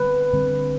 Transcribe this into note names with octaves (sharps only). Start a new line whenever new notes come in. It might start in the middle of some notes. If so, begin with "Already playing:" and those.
Already playing: D3 G3 C4 B4
D3 G3 C4